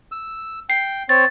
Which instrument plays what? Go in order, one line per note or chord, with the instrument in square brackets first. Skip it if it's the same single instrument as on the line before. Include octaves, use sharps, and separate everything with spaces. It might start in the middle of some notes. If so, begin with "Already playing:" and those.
[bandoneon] E6
[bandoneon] G5 [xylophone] C7
[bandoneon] C4 C#5 [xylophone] A6